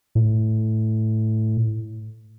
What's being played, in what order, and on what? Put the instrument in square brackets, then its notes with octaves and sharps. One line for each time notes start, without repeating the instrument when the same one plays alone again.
[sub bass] A2